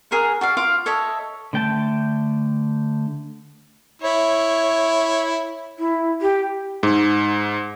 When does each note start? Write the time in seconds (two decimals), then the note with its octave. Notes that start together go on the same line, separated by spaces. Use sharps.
0.11 G#4 A#4 C#5 F#5
0.41 F#4 D5 F5
0.57 F4 F5 D6
0.86 A4 C#5 D#5 E5
1.53 D3 A3 G5 A5
4.02 E4 C#5
5.79 E4
6.22 G4
6.83 G#2